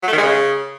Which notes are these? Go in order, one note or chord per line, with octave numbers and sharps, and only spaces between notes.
F#3
A3
D#3
G#3
C#3